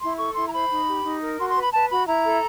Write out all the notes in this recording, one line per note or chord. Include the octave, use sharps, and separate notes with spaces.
E4 C6
A4 C#6
E4 C6
A#5
C5 B5
D#4
G4
D#4
A#4
F#4 C6
C6
B4
B5
B4 A5
F#4 B5
E4 A#5
A4